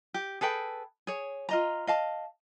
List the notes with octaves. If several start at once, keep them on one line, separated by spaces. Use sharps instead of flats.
G4
G#4 A4 B4 G5
G#4 C#5
F4 D#5 A#5
D#5 F5 A5